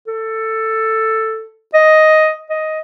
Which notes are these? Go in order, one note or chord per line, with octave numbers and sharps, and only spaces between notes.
A4
D#5
D#5